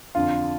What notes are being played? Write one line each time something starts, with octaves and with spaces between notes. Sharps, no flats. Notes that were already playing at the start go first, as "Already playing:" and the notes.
F2 D3 F4